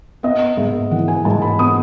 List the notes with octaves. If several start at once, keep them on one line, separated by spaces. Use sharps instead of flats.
B3 D#5
G#2 E5
E3 F#5
G#5
G#2 A5
B5
B3 D#6